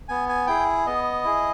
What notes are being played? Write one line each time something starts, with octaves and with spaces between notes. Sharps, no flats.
B3 G#5
G#5
E4 G#4 G5
B3 D#5
E4 G#4